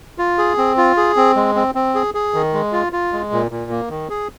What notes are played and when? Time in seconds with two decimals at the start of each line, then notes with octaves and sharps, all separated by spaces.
0.18 F4
0.38 G#4
0.58 C4
0.77 F4
0.97 G#4
1.16 C4
1.36 G#3
1.56 C4
1.75 C4
1.95 G#4
2.14 G#4
2.34 D#3
2.53 G#3
2.73 F4
2.93 F4
3.13 G#3
3.32 A#2
3.51 A#2
3.71 A#3
3.90 D#3
4.10 G#4